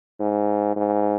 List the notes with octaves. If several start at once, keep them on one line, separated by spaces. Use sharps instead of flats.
G#2
G#2